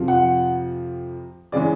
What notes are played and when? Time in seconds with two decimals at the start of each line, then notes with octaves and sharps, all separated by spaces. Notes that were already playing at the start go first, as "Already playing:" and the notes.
Already playing: F2 C3 F3
0.08 F#5
1.52 C#3 E3 G#3 D5